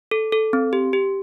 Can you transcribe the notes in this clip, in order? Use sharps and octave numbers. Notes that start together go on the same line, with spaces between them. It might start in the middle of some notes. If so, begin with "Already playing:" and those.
A4
A4
C4
G4
G4